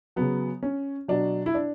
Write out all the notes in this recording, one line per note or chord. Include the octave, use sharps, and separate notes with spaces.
C#3 F#3 B3
C#4
B2 F#3 D4
E4
D4